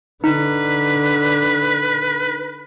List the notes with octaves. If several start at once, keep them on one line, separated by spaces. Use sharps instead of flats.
D3 D#4 B4